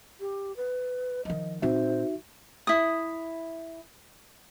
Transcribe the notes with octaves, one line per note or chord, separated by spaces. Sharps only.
G4
B4
D#3 F3 D#5
A#2 C4 D#4 F#4 C5 E5
E4 D#6